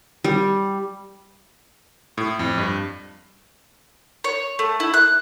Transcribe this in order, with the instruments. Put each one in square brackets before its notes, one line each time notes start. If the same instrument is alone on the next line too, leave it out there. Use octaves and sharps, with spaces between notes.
[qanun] G3
[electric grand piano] A2
F2
G2
[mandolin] C#5
A3
E4
F#6